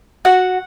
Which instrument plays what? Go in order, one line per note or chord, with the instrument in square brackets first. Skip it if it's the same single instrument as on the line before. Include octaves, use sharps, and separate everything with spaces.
[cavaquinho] F#4 F#5